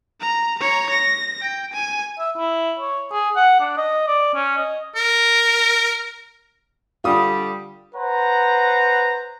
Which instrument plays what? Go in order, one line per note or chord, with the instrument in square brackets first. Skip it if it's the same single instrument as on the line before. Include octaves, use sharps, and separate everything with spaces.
[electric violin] A#5
C#5 A#5
A#6
G5
G#5
[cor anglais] E5
E4
C#5
G#4
F#5
D4
D#5
D5
C#4
D#5
[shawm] A#4
[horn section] D3 G3 [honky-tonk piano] F4 D#6
[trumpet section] B4 C5 F#5 A#5